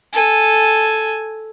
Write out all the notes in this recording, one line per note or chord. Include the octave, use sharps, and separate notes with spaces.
A4 G#5